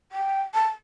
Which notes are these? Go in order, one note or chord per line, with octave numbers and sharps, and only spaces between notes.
G5
A5